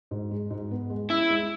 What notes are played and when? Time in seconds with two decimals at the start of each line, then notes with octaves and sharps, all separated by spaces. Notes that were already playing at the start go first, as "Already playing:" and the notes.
0.11 G#2
0.31 G#3
0.50 G#2
0.71 B3
0.90 G#3
1.10 C#4 E4
1.30 G#3